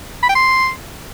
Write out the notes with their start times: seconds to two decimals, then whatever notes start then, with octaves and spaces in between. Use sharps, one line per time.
0.23 B5
0.29 G5
0.35 C6